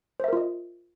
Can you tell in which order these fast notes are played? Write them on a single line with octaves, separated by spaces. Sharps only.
C5 E5 A#4 F4 D#5